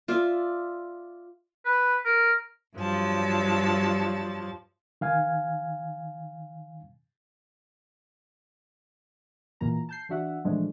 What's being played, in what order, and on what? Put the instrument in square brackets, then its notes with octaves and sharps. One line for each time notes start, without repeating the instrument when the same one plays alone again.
[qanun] F4 D5 E5
[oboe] B4
A#4
[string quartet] G2 F3 F#3 A5
[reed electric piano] D#3 F5 G#5
[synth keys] A#2 E3 A#3 A#5
A5 G6 C7
E3 D4 F#4 E5 F#5
A#2 E3 F3 G#3 A3 D4